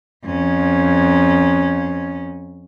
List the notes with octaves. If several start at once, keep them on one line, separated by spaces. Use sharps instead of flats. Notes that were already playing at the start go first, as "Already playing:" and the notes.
F2 C#4